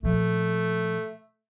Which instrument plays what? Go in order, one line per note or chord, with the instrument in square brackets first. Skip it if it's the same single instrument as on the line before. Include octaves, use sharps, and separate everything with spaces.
[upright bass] A#2 F3 [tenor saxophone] A3